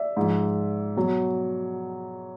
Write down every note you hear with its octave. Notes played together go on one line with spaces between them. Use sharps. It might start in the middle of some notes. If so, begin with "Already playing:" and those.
Already playing: D5 E5
G#2 F3
B2 F#3